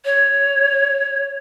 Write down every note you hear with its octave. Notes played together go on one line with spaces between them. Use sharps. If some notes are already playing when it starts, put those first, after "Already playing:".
C#5